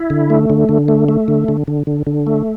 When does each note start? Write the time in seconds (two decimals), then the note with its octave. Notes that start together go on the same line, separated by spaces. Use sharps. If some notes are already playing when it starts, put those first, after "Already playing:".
Already playing: E4
0.10 D3
0.30 A3
0.50 D3
0.69 D3
0.88 A3
1.09 A3
1.28 D3
1.48 D3
1.68 D3
1.87 D3
2.07 D3
2.27 A3